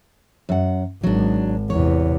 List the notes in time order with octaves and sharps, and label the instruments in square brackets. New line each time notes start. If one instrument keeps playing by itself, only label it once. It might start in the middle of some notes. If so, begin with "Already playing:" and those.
[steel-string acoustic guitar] F#2 F#5
[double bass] G#1 [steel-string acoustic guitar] F#3 D4
[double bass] E2 C3 [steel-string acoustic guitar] C#5